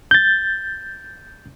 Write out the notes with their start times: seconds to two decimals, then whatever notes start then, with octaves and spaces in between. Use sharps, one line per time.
0.11 G6 A6